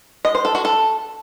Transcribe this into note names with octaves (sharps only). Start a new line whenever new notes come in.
D#5
C5
A4
F#4
A4